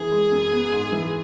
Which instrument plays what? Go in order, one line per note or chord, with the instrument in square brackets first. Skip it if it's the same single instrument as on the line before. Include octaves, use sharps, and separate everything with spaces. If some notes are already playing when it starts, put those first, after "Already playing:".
Already playing: [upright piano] F#2 E3 [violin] G#4
[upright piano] G#3
F#2
B3
G#2
E3